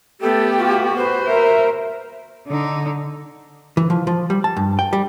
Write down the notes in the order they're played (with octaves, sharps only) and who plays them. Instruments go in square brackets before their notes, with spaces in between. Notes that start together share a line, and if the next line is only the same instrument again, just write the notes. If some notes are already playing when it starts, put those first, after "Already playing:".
[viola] A3 B3 [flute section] G4 [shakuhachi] A4
[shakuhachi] F4 [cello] F#4
[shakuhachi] B4 [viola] C5
[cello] A#4 [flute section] E5
[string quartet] D3 D#4
[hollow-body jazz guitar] E3
F3
F3
G3
A5
G2
G5
G3